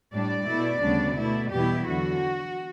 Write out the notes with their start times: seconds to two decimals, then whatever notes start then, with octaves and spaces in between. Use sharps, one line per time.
0.13 A2 G3 D4 D5
0.48 B2 A3 E4
0.83 D2 C#3 G3 B3 D4
1.17 B2 A3 E4
1.52 E2 B2 G3 B3 E4 G4
1.87 E2 D3 F#3 F#4